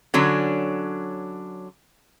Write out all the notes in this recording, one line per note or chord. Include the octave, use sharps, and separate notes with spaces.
D3 F#3 C#4 D4